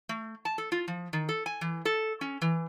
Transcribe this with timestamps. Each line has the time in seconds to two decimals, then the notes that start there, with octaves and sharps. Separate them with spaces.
0.09 A3
0.45 A5
0.58 A4
0.72 F4
0.88 F3
1.13 D#3
1.29 A4
1.46 G#5
1.61 E3
1.85 A4
2.21 C#4
2.42 E3